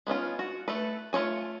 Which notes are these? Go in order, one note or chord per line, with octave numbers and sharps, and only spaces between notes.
G#3 B3 C#4 F4
F#4
A3 A4 B4
A3 F4 F#4 C#5 G#5